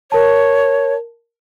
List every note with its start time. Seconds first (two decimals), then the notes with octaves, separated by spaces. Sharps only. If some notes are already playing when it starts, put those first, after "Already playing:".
0.12 A#4 C#5 A5